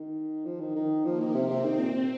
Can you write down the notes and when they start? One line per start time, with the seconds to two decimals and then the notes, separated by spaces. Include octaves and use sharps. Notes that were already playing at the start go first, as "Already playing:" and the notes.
Already playing: D#3
0.45 F3
0.60 D#3
0.75 D#3
1.05 F3 A#3
1.19 D#3
1.34 C3 C4
1.50 C3
1.65 D#3
1.79 A#2